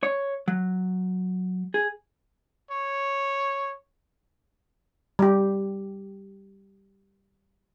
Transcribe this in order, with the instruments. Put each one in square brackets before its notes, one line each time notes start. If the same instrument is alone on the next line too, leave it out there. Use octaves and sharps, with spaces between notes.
[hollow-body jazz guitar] C#5
F#3
G#4
[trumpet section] C#5
[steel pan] G3 G4